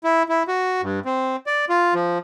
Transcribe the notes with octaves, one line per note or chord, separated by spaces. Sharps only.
E4
E4
F#4
G2
C4
D5
F4
F3